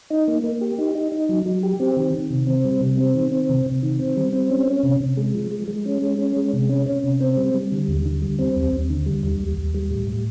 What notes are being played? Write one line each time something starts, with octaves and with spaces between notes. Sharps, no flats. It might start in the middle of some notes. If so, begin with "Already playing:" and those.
D#4
A#3
A#3
G4
D#4
D#4
D#4
F#3
F#3
G4
C4
D#3
D#3
C3
C4
G3
C3
C4
D#3
C4
C3
C3
D#3
C4
G3
C4
C#4
C#4
C3
C3
G#3
F3
G#3
G#3
C#4
G#3
C#4
G#3
C3
C#4
C#4
C3
C4
G3
G3
D3
D#2
D3
G3
C4
D#2
D#2
D3
G3
D#2
D#2
D#2
G3
A2
A2